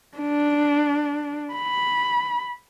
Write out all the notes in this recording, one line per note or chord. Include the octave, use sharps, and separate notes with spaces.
D4
B5